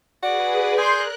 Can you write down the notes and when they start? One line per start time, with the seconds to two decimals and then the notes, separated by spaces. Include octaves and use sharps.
0.23 F#4 G#4 B4 D5
0.78 G#4 A#4 C6 F#6 G6